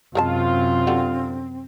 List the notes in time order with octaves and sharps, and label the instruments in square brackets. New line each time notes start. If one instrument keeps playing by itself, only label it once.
[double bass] F#2 C3 [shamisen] G#3 A#4 A5 [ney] C4 [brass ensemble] F4
[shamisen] D3 F#4 G4